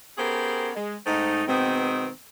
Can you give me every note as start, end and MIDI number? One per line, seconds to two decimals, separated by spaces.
0.18 0.70 59
0.18 0.70 61
0.18 0.70 67
0.18 0.70 68
0.18 0.70 70
0.18 0.70 72
0.76 0.95 56
1.06 1.42 44
1.06 1.42 57
1.06 1.42 60
1.06 1.42 63
1.48 2.09 47
1.48 2.09 51
1.48 2.09 56
1.48 2.09 59
1.48 2.09 60